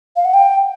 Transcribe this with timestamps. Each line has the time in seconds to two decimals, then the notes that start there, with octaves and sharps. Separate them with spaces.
0.16 F5
0.25 F#5
0.34 G5